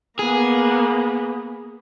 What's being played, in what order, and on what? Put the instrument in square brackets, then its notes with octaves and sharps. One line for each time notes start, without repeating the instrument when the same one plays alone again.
[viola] A#3 B3 [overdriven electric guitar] G#4